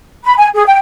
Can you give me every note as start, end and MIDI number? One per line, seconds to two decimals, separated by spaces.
0.24 0.34 83
0.37 0.47 80
0.54 0.63 68
0.66 0.77 79